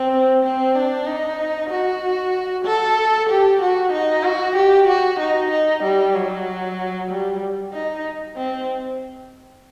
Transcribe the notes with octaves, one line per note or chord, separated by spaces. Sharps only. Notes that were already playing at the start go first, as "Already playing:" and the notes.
Already playing: C4
C4
D4
D#4
F#4
A4
G4
F#4
D#4
F#4
G4
F#4
D#4
D#4
G3
F#3
G3
D#4
C4